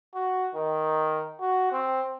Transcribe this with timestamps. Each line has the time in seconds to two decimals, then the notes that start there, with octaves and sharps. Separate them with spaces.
0.15 F#4
0.55 D#3
1.41 F#4
1.72 C4